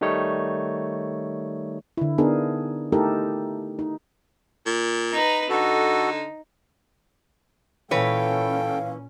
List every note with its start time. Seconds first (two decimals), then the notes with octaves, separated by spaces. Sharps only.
0.01 D#3 G3 A3 D#4 C#5
1.97 D3 E4
2.18 B3 D4 D#4 G#4 A#4
2.92 A3 D#4 E4 G4 A4 A#4
3.79 D#4
4.66 A#2
5.12 D#4 B4 A#5
5.50 D3 D#4 F#4 A4
7.91 A#2 E3 C#4 A4 B4 C#5 F5 G5